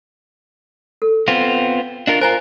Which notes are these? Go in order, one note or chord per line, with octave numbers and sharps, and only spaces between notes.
A4
B3 C4 F4
D4 F4 A#4 D#5
F4 A#4 C5 G#5 A#5